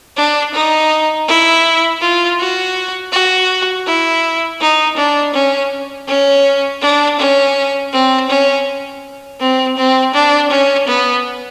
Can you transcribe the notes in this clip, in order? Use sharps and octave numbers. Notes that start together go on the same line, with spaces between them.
D4
D#4
E4
F4
F#4
F#4
E4
D#4
D4
C#4
C#4
D4
C#4
C4
C#4
C4
C4
D4
C#4
B3